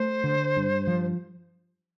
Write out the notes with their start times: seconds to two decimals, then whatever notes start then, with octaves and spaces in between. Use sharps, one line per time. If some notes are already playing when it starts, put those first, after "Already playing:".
Already playing: A3 C5
0.24 D3
0.56 G2
0.87 F3